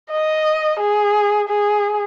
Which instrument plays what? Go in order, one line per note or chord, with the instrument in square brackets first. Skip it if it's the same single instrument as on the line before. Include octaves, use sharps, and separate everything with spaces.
[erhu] D#5
G#4
G#4